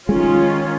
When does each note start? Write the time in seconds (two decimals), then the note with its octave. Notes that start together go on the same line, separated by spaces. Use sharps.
0.08 D#3 G#3 C#4 F4